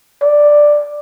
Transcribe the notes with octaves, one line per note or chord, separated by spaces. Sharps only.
D5